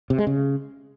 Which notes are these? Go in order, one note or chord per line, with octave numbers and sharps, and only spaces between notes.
C3
G#3
C#3